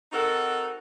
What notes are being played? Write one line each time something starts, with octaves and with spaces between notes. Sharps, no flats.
C4 D#4 F#4 A4 A#4 F#5